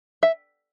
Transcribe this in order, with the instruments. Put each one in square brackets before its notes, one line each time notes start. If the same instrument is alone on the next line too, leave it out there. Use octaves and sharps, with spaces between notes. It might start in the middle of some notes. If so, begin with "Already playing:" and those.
[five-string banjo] E5